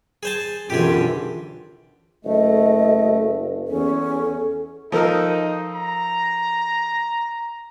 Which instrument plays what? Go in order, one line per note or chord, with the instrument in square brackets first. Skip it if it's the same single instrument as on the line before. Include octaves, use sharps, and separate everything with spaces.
[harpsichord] G#4 C5 A5
[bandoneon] F#2 [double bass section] B2 D3 E3 [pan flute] F4 [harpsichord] G4 G#4
[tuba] F#1 [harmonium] A3 [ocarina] A4 [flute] D#5
[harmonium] E2 [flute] C#4 [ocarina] A4
[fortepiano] F3 A4 A#4 [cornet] D#4
[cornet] A#5